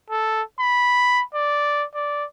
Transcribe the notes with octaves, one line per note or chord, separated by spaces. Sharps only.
A4
B5
D5
D5